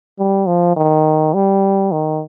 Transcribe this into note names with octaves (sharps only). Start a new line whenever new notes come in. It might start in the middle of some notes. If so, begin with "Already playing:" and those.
G3
F3
D#3
G3
D#3